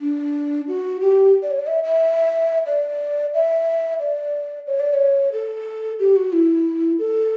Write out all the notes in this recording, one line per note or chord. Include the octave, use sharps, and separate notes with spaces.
D4
F#4
G4
D5
C#5
D5
E5
E5
D5
E5
D5
C#5
D5
C#5
A4
G4
F#4
E4
A4